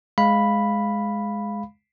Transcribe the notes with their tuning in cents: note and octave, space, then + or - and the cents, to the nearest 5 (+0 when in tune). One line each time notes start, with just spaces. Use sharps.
G#3 +5 F5 +0 B5 +0